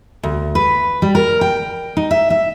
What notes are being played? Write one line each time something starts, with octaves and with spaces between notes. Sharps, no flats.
D2
B4
G3
A#4
G5
D#4
E5
E5